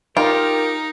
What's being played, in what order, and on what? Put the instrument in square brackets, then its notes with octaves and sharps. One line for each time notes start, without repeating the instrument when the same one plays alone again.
[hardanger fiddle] D#4 [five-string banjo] F4 [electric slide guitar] G4 [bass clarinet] A#4